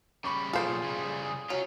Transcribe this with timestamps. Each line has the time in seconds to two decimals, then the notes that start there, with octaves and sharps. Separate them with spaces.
0.24 C#3 G3 B5 C#6 D6
0.53 B1 A#2 F4 G#4 A4 C5
0.83 C#3 G3
1.50 F#3 C#4 F4